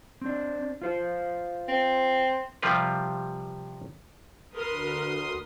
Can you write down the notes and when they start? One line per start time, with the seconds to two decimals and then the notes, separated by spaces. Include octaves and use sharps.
0.22 C4 D4
0.82 F4 C5
1.68 C4
2.62 C3 F3 G3 F4 A#4 B4
4.54 D2 A#4 B4 C6 D#6